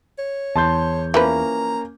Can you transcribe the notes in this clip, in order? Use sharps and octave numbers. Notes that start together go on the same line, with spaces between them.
C#5
E2 A5 C6 G6
E3 F3 A#3 C#4 B4 A#5